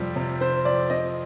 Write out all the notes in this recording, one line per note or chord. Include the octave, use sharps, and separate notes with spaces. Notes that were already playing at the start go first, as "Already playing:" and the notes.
Already playing: F2 C3 G3 C4
C3
C4 C5
F2 D5
C4 D#5